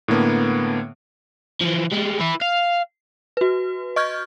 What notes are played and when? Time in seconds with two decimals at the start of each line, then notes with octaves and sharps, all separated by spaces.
0.08 A2 D3 A#3 B3
1.61 E3 F3
1.92 G3 G#3
2.20 E4 B4
2.42 F5
3.37 F#4 B4
3.96 D#5 C#6 F6 G6 G#6